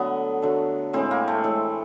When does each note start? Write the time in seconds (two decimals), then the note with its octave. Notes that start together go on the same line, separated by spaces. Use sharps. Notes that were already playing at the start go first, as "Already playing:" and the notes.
Already playing: D3 F#3 A3 B3
0.42 D3 F#3 A3
0.93 A2 E3 G#3 C4
1.11 A#3
1.28 A3
1.44 A2 E3 G#3